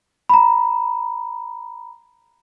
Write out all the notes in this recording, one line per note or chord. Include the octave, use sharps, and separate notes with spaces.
A#5 B5